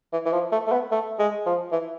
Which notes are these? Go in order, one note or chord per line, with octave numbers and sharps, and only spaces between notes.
E3
E3
F3
A3
A3
B3
A3
G#3
F3
E3